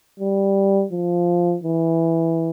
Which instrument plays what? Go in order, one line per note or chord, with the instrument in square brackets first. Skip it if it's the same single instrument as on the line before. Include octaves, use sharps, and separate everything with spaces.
[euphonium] G3
F3
E3